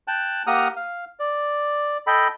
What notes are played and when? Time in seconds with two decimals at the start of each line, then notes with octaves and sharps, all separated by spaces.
0.08 G5 A5 F#6
0.47 A#3 G4 F#5 A#5 D#6 F6
0.76 F5
1.19 D5
2.07 A4 D#5 G5 B5